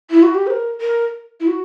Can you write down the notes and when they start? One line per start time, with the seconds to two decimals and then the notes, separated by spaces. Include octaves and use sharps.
0.11 E4
0.23 F#4
0.35 G4
0.47 C5
0.50 A#4
0.81 A#4
1.40 E4
1.47 F#4